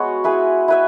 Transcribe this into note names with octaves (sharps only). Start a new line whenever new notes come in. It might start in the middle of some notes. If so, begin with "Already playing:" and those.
Already playing: G#3 B3 F#4 C#5
E4 G#4 B4 E5
E4 B4 E5